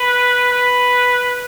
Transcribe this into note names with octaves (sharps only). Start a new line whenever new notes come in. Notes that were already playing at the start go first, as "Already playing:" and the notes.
Already playing: B4
B4